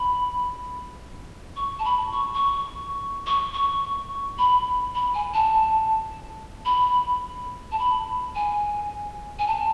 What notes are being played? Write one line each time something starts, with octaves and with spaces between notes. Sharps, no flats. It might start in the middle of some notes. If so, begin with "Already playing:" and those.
Already playing: B5
C#6
A5
B5
C#6
C#6
C#6
C#6
B5
B5
G#5
A5
B5
A5
B5
G#5
G#5
A5